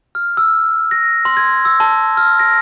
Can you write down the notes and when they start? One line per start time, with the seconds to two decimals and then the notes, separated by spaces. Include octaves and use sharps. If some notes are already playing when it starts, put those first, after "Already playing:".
0.15 F6
0.37 E6
0.91 A#6
1.25 C6
1.37 G#6
1.65 E6
1.80 A5
2.17 F6
2.39 A#6